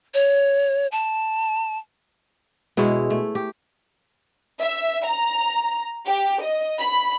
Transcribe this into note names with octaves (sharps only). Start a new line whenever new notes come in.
C#5
A5
B2 G#3 E4 C#5
A3
G4
E5
A#5
G4
D#5
B5